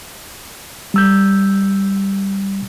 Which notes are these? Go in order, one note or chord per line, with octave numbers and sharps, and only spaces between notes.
G3 E6 G6